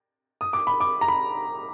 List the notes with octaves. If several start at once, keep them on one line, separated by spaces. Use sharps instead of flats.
D#6
D6
B5
D6
A#5
B5